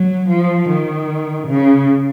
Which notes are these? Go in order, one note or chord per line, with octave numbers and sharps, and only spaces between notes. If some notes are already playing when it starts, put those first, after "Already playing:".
Already playing: F#3
F3
D#3
C#3